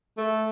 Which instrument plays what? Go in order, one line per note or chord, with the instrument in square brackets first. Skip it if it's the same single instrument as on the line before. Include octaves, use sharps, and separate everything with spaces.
[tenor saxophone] A3